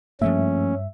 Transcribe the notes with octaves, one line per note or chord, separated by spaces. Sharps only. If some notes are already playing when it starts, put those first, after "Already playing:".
G2 F3 A3 A#3 C#4 E5